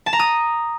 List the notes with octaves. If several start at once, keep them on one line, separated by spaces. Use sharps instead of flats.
A5
A#5
D#6